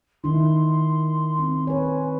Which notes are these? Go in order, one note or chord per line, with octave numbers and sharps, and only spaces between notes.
D#3 D#4 E4 C6
C4
B4 C#5 G#5